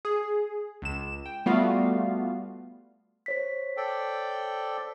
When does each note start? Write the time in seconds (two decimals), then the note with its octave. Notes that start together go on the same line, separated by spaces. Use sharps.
0.05 G#4
0.82 C#2 E7
1.26 G5
1.46 G3 A3 B3 F4 F#4 F5
3.26 C5 C#5 B6
3.77 A4 D5 G5